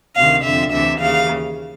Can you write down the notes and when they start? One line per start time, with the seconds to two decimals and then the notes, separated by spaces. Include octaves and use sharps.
0.16 D2 C3 D#3 F5
0.44 F2 D3 E5
0.72 D2 C3 E3 E5
1.00 D#2 C#3 E3 F5